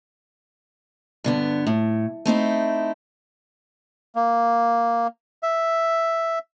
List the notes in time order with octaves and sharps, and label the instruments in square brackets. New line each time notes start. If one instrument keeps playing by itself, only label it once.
[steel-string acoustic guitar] G2 D3 B3
A2
A3 C4 D#4 E4
[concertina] A#3
E5